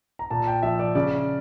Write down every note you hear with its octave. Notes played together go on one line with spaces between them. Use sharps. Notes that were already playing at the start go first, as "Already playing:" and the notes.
A#5
A#2 A5
G5
F3 E5
D5
C#3 D5